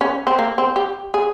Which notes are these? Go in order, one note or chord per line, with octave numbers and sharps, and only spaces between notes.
C#4
C4
A#3
C4
G4
G#4